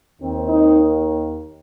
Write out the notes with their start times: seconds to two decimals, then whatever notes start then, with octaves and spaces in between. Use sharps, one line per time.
0.19 D#2 D#3 C4
0.49 D#4